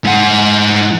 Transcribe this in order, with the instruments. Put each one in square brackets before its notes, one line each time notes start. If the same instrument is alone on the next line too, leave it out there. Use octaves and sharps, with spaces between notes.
[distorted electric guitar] G#2 F#5